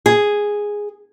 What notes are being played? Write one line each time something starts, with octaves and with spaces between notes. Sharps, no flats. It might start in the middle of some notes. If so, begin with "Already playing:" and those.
G#4